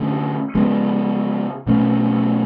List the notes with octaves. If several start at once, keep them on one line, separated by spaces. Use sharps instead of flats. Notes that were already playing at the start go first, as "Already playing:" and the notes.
Already playing: D3 A3 C#4
C#3 G#3 B3
B2 A3 C#4